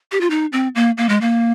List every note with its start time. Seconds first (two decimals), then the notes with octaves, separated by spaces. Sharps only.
0.12 G4
0.21 F4
0.30 D#4
0.52 C4
0.75 A#3
0.98 A#3
1.09 G#3
1.21 A#3